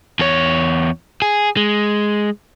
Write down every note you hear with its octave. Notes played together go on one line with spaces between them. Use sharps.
E2 C#5
G#4
G#3